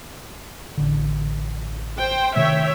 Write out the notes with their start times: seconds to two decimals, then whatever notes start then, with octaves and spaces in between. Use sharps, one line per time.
0.77 A1 D3
2.00 C5 G5
2.36 C3 D#3 A3 C#5 E5 G5